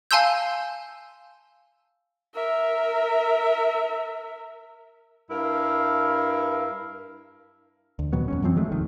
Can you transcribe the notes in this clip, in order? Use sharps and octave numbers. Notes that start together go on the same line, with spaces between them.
F5 G#5 A5 C6 E6 G6
A#4 E5
G2 E4 A#4 F5
D2
A#2 D#3 F#3 B3
F2 F#3 C#4
F#2 E3 F3 C4
D#3 F#3 G#3 A3
F1 A#1 D#2 D#3